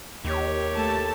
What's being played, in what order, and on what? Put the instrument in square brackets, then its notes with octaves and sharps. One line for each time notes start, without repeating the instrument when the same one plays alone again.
[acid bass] D#2 [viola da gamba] G4 C#5
[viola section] A3 A4 A5